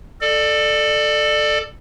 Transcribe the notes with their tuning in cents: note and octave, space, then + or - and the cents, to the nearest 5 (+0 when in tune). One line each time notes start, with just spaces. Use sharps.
A4 +0 D5 +25